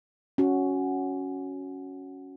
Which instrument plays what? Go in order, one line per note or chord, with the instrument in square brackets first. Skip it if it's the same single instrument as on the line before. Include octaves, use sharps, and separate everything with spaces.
[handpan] C#4 F#4